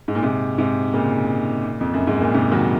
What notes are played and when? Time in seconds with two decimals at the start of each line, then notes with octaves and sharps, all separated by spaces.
0.08 G#2
0.15 A#2
0.23 G#2 C3
0.58 G#2 C3
0.94 A#2 C#3
1.81 F2
1.94 F#2
2.07 G#2
2.21 A#2
2.34 G#2 C3
2.52 D#3 F#3